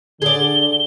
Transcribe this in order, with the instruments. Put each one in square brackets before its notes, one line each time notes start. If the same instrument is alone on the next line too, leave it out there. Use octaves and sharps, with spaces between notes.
[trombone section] D3 [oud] G#4 D5 [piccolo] G7